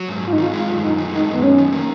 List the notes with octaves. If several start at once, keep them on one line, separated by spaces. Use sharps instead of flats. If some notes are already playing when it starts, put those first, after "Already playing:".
Already playing: F#3
G#2
G#2 F4
D#4
D#3 F4
G#3 F4
F#2
F#2 D#4
D#3
G#3 D#4
F#2
B3
F#2 C#4
D#3
A#3